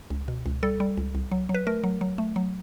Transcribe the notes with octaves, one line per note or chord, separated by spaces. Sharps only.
C#2
B2
C#2
G3 A4
G3
C#2
C2
F#3
F#3
B4
A3 A#4
F#3
F#3
A3
F#3